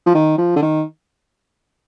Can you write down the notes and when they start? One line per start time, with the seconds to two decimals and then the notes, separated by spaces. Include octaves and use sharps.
0.06 F3
0.15 D#3
0.38 F3
0.56 D3
0.62 D#3